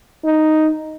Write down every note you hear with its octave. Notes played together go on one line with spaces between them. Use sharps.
D#4